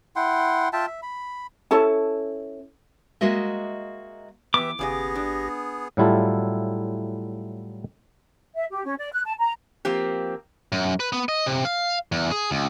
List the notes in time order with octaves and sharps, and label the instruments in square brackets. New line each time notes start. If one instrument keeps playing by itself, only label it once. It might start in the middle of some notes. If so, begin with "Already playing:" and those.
[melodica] E4 F#5 G5 C6
F4 E5 G5 A5
E5
B5
[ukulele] C#4 E4 A4 A5
[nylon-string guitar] G#3 A#3 F#4 D#5 E5
[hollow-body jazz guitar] E3 B3 [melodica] G4 E5 [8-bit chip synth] B4 [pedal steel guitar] D6
[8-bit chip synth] G#1 G4 A#6 [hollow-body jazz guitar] C#3 D5 G#5 [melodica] B3 G#4
[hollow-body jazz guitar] D4
[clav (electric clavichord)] A2 F#3 G3 E4 F4 A4
[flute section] E5
G4
C#4
D5
F#6
A5
A#5
[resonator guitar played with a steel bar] F3 A#3 C4 G4
[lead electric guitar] F#2
B4
B3
D#5
C3
F5
E2
G#4
C#2